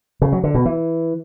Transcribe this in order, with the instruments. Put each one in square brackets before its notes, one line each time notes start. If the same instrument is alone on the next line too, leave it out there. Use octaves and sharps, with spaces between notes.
[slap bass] C#3
F#3
D3
B2
E3